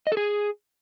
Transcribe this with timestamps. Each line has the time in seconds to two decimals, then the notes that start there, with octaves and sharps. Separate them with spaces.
0.07 D#5
0.12 A4
0.17 G#4